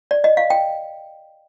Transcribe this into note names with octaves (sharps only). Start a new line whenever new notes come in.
D5
D#5
F5
G5